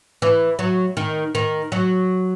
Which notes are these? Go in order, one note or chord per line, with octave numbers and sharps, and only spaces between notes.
E3
F#3
D#3
D#3
F#3